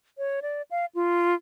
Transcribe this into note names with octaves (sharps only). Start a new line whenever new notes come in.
C#5
D5
F5
F4